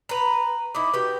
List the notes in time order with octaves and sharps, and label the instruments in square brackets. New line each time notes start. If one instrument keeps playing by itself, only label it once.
[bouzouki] B4 A#5
[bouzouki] D#4 E4 [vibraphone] D6
[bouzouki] F#4 G4 [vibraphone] B4